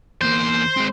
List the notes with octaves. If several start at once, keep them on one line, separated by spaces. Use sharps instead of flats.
E2 A#3 C5
G#3 C4